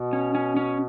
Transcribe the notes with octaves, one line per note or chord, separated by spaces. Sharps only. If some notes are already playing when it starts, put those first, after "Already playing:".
Already playing: B2
C#4
C#4
C#4